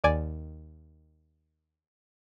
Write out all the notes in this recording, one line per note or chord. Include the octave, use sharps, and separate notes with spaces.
D#2 D5 G#5